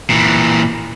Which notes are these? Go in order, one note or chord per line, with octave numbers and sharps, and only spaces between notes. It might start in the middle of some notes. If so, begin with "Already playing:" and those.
A#2 E3